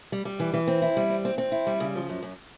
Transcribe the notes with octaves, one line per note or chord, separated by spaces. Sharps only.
G3
G3
E3
E3
C4
E4
G3
C4
C4
C4
E4
G3
C#3
F3
F#2
F#2